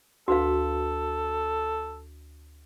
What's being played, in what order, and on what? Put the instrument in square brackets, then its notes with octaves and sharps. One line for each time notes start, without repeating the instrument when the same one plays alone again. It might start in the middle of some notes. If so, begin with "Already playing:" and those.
[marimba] D2 [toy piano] F#4 B4 F5 [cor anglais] A4